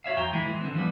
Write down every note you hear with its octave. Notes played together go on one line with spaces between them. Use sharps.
F#4 C#5 E5 F5
F2 G5 A#5
E3 G#3 E4
E3 G#3
D3 C4
E3 F3 G3 B3